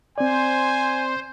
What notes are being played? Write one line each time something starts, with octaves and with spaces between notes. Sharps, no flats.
C4 C5 D5 G#5